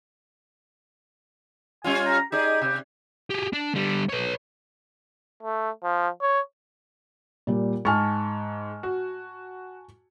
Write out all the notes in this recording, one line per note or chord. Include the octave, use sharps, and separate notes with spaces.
G3 C#4 F4 G#5
A#5
D#4 G4 G#4 D5
C3 G4
G4 G#4
D4
D3 G3
B4 C#5
A3
F3
C#5
A#2 G3
G#2 G#5 A5 C#6 F6
F#4